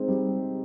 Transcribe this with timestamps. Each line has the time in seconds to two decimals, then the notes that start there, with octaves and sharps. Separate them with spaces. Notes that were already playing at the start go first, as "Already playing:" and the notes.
Already playing: G#3 C4 D#4
0.08 G3